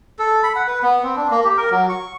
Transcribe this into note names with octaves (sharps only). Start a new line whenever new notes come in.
A4
B5
F#5
B4
B3
C4
D4
A#3
G4
A#4
F#3
C#6